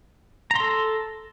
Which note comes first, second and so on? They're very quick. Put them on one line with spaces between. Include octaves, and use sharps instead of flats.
A#5 C6 A4